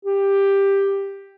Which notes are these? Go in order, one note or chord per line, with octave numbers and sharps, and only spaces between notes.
G4